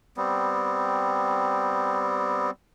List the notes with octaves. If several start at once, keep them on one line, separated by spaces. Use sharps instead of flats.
G3 B3 C4